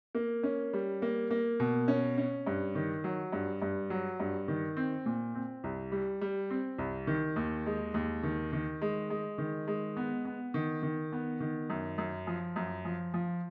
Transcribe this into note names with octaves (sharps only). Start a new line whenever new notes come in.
A#3
C#4
G3
A#3
A#3
B2
C#4
C#4
G2
D#3
F#3
G2
G2
F#3
G2
D#3
C4
A#2
C4
C2
G3
G3
C4
C2
D#3
D#2
G#3
D#2
D#3
D#3
G#3
G#3
D#3
G#3
B3
B3
D#3
D#3
B3
D#3
F#2
F#2
F3
F#2
F3
F3